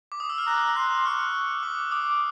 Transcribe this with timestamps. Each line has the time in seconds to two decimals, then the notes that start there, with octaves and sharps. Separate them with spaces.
0.12 D6
0.20 D#6
0.29 E6
0.38 F6
0.47 A#5 F#6
0.76 C6 F#6
1.05 C#6 F6
1.63 D6
1.91 D6 D#6